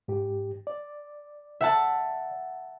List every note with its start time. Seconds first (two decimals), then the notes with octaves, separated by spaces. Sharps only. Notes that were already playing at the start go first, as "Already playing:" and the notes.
0.08 G#2 G4
0.67 D5
1.61 E5 F#5 A5